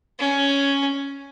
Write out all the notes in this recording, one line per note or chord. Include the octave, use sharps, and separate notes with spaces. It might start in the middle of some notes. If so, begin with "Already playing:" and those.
C#4